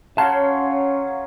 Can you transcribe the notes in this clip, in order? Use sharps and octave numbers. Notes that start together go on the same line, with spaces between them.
C#3 F#3 C#4 C#5 F5 F#5 A5 C6